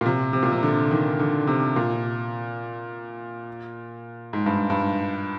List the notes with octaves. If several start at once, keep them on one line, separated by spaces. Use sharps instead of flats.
A#2
C3
C3
A#2
C3
D3
D#3
D3
C3
A#2
G#2
G2
G2